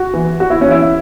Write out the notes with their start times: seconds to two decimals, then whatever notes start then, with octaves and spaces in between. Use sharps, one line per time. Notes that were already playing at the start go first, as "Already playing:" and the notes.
Already playing: F#4
0.14 E3
0.40 E2 F#4
0.50 E4
0.61 C#4
0.67 E3 E4